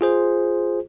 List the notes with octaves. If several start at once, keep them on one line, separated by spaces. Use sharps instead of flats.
F4 G#4 C5